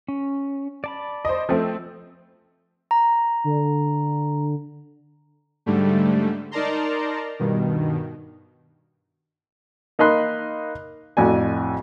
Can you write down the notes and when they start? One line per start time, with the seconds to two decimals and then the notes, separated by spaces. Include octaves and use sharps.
0.08 C#4
0.84 D5 A5 B5
1.25 C5 D#5
1.49 F3 A3 C4
2.91 A#5
3.44 D3
5.66 G#2 D3 G3 A3
6.51 D#4 A#4 D5 A5 A#5 C6
7.39 G2 B2 D#3
9.99 A#3 D#4 D#5 B5 C6 F#6
11.17 F2 A2 F#4 D5 G#5